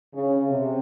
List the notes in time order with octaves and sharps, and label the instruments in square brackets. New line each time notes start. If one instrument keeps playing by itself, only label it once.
[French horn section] C#3
C3